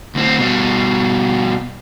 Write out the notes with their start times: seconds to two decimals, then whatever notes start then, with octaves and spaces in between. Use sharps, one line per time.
0.15 D2 C4
0.39 B2 G3